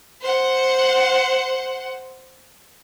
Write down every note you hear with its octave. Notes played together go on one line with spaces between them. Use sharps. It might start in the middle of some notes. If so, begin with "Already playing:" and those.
C5 F#5